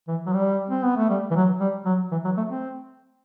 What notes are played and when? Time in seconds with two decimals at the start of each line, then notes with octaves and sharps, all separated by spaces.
0.08 E3
0.26 F#3
0.33 G3
0.69 C4
0.83 B3
0.97 A3
1.10 G3
1.31 E3
1.36 F#3
1.60 G3
1.85 F#3
2.11 E3
2.25 F#3
2.37 A3
2.50 C4